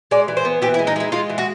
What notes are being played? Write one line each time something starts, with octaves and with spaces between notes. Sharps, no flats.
G#3 D5
E3
C5
B3
E3 G4
E4
G#3
D#4
G#3 E4
G#3 F4
E3
F#4